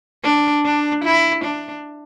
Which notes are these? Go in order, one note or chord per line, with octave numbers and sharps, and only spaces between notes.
D4
D4
E4
D4